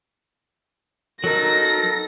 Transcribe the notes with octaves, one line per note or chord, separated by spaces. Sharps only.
F#3 D#4 A4 A#4 A#6